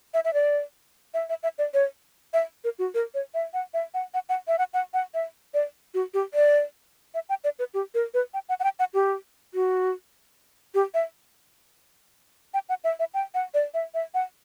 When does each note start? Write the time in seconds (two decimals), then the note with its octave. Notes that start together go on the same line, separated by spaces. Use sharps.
0.14 E5
0.25 E5
0.34 D5
1.14 E5
1.29 E5
1.43 E5
1.58 D5
1.74 C#5
2.33 E5
2.64 A#4
2.79 F#4
2.94 A#4
3.14 C#5
3.34 E5
3.54 F#5
3.74 E5
3.94 F#5
4.14 F#5
4.29 F#5
4.48 E5
4.59 F#5
4.74 F#5
4.94 F#5
5.14 E5
5.54 D5
5.94 F#4
6.14 G4
6.34 D5
7.14 E5
7.29 G5
7.44 D5
7.59 B4
7.74 G4
7.94 A#4
8.14 B4
8.34 G5
8.49 F#5
8.60 F#5
8.64 G5
8.79 F#5
8.94 G4
9.54 F#4
10.74 G4
10.94 E5
12.54 G5
12.69 F#5
12.84 E5
12.99 E5
13.14 G5
13.34 F#5
13.54 D5
13.74 E5
13.94 E5
14.14 F#5